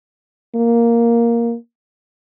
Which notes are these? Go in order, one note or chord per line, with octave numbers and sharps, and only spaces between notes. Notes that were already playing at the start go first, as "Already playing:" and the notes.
A#3